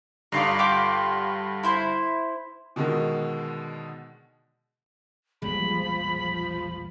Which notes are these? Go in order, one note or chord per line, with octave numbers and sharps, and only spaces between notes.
G2 D3 D#4 F4 D5 C7
F4 G4 D6
E4 C5
B2 D3 D#3 G#3
E1 A#1 F3 G3 G#3 G#4 B5